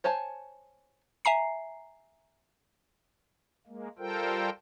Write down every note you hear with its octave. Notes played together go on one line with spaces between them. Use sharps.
C5 C#5 G#5 A5
E5 G#5 A#5 C7
G#3 A#3
G3 F4 A4 A#4 C5 G5